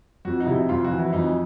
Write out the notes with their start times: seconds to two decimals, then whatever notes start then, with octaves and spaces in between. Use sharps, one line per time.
0.25 F2 F#4
0.40 D#4
0.46 C3 E4
0.69 F2 F4
0.84 F#4
0.91 E3
0.99 E4
1.13 F2 D#4